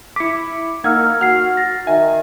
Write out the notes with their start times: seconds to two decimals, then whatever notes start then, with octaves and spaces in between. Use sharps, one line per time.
0.16 E4 D6 B6 C#7
0.84 A#3 D#4 F#5 E6 F6 G#6
1.21 F#4 F#5 F6 C7
1.57 A6 A#6
1.87 D#3 E5 G#5